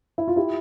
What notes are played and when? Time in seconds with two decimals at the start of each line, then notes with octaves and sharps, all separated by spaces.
0.18 E4
0.28 F4
0.36 E4 G4